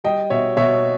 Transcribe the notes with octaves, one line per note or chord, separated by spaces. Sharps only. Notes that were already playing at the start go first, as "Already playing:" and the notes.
G3 D#5 G5
B2 C#5 E5
B2 C#5 E5